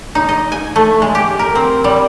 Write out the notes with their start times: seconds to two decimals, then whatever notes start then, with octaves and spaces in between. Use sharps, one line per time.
0.15 D#4
0.29 D#5
0.52 G#5
0.76 A3
1.02 G#3
1.15 G4
1.39 A#4
1.55 C4
1.84 G3